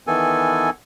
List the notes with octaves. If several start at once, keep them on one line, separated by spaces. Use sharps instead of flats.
D#3 E3 B3 A4 G#5